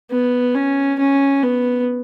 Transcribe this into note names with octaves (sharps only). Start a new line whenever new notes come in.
B3
C#4
C#4
B3